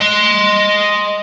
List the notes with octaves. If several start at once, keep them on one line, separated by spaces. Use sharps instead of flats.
D#5 C6